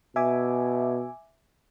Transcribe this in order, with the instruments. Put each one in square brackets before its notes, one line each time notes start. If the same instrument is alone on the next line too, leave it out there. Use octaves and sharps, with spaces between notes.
[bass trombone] B2 [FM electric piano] E5 G#5 D6